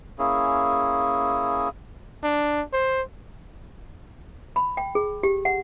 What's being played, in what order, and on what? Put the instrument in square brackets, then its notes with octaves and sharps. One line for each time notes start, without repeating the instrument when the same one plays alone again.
[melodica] A#3 C#4 E4 G#4
[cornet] D4
C5
[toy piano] B5
G5
G#4
G4
F#5